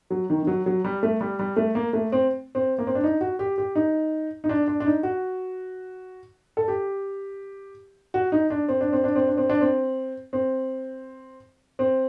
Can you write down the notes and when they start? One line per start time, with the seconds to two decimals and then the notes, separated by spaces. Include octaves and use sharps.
0.10 F#3
0.30 D#3
0.43 D#3
0.47 F#3
0.66 F#3
0.84 G3
1.03 A3
1.21 G3
1.39 G3
1.56 A3
1.75 A#3
1.93 A3
2.12 C4
2.55 C4
2.79 A#3
2.87 C4
2.95 D4
3.04 D#4
3.21 F#4
3.39 G4
3.58 G4
3.75 D#4
4.44 D#4
4.49 D4
4.68 D4
4.80 D4
4.86 D#4
5.03 F#4
6.57 A4
6.68 G4
8.14 F#4
8.32 D#4
8.50 D4
8.68 C4
8.81 D4
8.92 C4
9.04 D4
9.15 C4
9.27 D4
9.37 C4
9.50 D4
9.61 C4
10.33 C4
11.79 C4